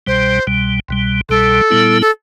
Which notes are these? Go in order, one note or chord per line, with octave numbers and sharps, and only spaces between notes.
C2 B2 G3 C5
C2 B2 G3
C2 B2 G3
C2 B2 G3 A4
A#2 G3 B3 E4
A4